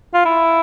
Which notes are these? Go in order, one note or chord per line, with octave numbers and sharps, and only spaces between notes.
F4
E4